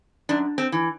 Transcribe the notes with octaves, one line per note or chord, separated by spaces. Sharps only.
F#2 D4
C4
E3